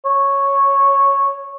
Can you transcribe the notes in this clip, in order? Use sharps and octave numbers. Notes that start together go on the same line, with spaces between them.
C#5